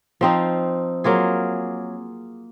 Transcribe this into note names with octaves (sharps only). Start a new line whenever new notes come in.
F3 C4 D#4
F#3 A#3 F4 G#4